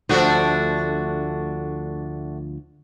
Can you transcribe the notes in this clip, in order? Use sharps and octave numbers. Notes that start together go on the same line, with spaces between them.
D2 F3 A3 D4 F#4